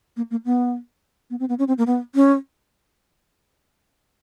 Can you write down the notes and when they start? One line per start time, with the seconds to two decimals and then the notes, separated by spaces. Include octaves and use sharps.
0.17 A#3
0.31 A#3
0.45 B3
1.30 B3
1.40 C4
1.49 B3
1.59 C#4
1.68 C4
1.78 A#3
1.87 B3
2.15 C#4